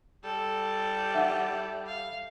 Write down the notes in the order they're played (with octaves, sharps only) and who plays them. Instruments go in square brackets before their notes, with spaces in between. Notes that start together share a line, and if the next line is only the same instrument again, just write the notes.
[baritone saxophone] G3 [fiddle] A4
[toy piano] D#4 F#5 D6 [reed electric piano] E5
[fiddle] F5